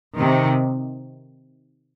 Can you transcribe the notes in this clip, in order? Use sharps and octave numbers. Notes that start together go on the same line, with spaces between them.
C3 D#3